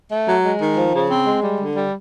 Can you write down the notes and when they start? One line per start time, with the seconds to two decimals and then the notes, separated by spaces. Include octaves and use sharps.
0.10 A3
0.26 F#3
0.43 G#3
0.59 D#3
0.76 F3
0.93 C#3
1.10 C4
1.26 G#3
1.43 G3
1.59 D3
1.76 G3